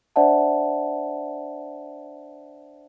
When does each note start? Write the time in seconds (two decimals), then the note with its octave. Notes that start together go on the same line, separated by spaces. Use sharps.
0.16 D4 C5 D5 E5 F#5 A5